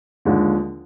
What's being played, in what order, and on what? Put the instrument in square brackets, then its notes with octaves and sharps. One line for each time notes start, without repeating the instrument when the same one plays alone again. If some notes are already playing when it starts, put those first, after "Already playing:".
[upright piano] D#2 D3 F3 G#3